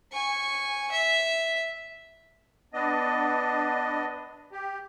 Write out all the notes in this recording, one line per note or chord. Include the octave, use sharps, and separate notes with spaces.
G#5 C#6
E5
B3 D4 D#5
G4